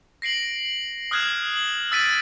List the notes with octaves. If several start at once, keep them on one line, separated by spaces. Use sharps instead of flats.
A#6 C7 D7 F#7
D#6 F6 F#6 G#6 C7 E7
F#7
E6 A6 B6 D7 D#7